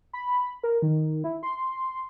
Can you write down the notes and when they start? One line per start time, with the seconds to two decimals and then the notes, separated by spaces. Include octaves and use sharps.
0.13 B5
0.64 A#4
0.82 D#3
1.24 E4
1.43 C6